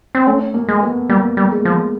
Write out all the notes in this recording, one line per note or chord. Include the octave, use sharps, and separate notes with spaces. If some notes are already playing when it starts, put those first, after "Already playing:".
C4
A3 C#4
A#3
G#3
B3
G3 A#3
G3
G#3
F3